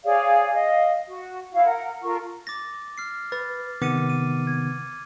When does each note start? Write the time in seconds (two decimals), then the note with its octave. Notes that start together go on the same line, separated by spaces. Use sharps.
0.04 G#4 C#5 D5 F5
0.53 D#5 F5
1.07 F#4
1.52 E4 F#4 F5
1.65 A#4 F#5
2.03 F4 A4 A#4 C#6
2.47 D6 A6 A#6
2.98 F6 C7
3.32 B4 A6
3.82 C3 D#3 B3 D6 C#7 D#7
4.10 D#7
4.47 G#6